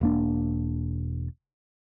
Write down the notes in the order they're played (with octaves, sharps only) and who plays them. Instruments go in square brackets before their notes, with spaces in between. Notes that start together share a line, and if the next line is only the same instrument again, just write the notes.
[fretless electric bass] E1 A#3 D4